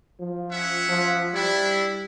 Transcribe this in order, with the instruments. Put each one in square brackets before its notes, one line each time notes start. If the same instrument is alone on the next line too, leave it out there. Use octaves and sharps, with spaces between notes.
[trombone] F3
[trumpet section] C#4 E5 F#5
[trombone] F3
[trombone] G3 [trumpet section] D4 E4